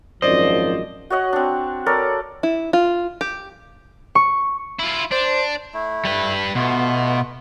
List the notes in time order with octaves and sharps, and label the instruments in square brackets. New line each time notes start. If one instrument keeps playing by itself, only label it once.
[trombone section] G#1 F#2 F3 [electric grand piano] C5 D5 [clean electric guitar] D#5
[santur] F#4 C#5 D#5 F#5
C4 D4
A4 A#4 C#5 D5
[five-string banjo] E4
F4
G4
[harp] C#6
[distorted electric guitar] E4 F4
[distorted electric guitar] D4 [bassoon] C5
[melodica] A3 E4
[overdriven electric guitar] G3 B4
[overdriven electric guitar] B2 [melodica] A3 B3 F4